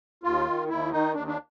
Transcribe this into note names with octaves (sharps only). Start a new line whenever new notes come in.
D#2 F4
D#3
D#2 E4
D#3 D#4
D#2 D4
D4